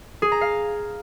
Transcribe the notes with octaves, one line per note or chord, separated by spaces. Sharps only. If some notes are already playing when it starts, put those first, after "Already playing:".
G#4
A#5
F5